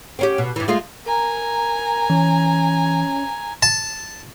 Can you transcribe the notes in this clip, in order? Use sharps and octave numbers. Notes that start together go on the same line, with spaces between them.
C4 C#4 G4
B2
G2 E3
G#3 A3 F4
A#4 G#5 A#5
E3 C#4
A5